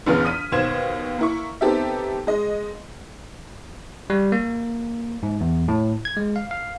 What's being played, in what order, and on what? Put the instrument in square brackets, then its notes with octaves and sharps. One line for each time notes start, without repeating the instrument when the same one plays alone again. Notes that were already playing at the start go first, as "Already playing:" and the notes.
[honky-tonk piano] A#1 E2 C#3 B3 F6
D#6 B6 D#7
D#2 B2 C5 G#6 E7
A#3 E4 C#6
B3 C4 D#4 G4 A4 E5
G#3 D#5
[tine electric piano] G3
A#3
G#2
E2
A2
G#6
G#3
F5
F5